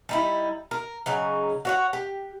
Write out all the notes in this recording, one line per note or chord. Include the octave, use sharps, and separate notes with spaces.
G3 D#4 E4
A#4
C#3 F#3 D#4
F#4 C#5 F#5
G4